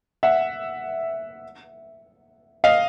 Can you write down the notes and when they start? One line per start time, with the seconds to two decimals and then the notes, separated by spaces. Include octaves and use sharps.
0.23 E5 F#5
2.64 D#5 F5